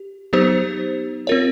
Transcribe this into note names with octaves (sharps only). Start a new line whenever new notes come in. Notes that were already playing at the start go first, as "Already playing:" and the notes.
Already playing: G4
F#3 B3 D#4 G4 C5
C4 F4 A#4 C#5